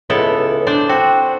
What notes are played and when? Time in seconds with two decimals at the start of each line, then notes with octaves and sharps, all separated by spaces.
0.10 C#2 B3 E4 A4
0.67 D4 C5 D5
0.89 C4 F#4